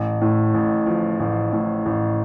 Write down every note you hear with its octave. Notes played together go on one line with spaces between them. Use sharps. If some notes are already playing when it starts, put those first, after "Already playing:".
Already playing: A1
A2
A1
F3
A1
A2
A1